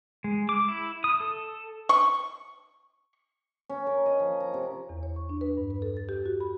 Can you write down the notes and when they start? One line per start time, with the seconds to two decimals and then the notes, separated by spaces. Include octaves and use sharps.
0.24 G#3
0.49 D6
0.68 E4
1.04 D#6
1.20 A4
1.89 C#6
3.70 C#4
3.87 A#4
4.06 D#5
4.20 F3
4.40 A#5
4.54 C3
4.89 E2
5.03 C#5
5.16 C#6
5.29 D4
5.41 B4
5.57 G2
5.70 B4
5.82 A4
5.97 A6
6.09 G4
6.26 F#4
6.40 B5